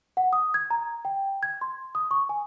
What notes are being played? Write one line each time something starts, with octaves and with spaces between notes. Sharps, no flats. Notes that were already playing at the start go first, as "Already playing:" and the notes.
F#5
D#6
G#6
A#5
G5
G#6
C6
D#6
C#6
G#5